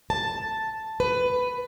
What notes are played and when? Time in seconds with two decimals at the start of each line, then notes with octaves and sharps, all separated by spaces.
0.10 A5
1.00 B4